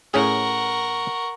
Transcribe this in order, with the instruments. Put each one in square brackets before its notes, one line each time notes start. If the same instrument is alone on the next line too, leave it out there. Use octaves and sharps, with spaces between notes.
[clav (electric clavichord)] A2 C#4 G#4 [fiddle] A#4 F#5 [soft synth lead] C#6